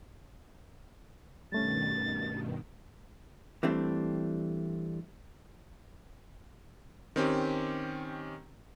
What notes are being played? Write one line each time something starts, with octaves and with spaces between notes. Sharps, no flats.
G2 B2 D#3 G3 A3 C#4 A6
E3 G3 A3 C4 D4
D#3 C4 C#4 G4